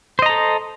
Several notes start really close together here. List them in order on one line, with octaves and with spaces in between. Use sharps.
C5 D#5 A#5 A4